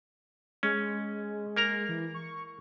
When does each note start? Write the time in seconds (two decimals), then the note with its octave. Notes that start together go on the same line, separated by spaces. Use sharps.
0.63 G#3 C#4
1.57 A#3 A#4 A#5
1.89 E3
2.14 C#6